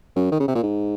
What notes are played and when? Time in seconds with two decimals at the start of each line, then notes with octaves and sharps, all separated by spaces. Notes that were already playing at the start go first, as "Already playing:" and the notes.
0.16 F#2
0.32 D#3
0.40 C#3
0.48 C3
0.55 A#2
0.63 G#2